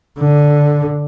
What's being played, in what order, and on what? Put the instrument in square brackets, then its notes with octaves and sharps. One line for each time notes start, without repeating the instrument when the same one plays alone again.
[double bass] D3